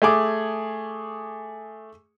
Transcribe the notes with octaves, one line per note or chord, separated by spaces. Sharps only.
A3 G#4 D6